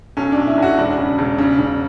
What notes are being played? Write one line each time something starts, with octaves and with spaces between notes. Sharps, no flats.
B1 C#4
B1 D4
E4
B1 F#4
E1 D4
C#3
E1
C#3
C#3